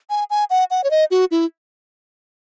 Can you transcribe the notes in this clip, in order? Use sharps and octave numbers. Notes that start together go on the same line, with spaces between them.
G#5
G#5
F#5
F#5
C#5
D#5
F#4
E4